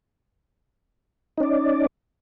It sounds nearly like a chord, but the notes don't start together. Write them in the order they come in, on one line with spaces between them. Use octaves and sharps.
D#4 C#4 D5